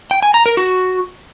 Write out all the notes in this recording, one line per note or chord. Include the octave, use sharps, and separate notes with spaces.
G5
G#5
A#5
A#4
F#4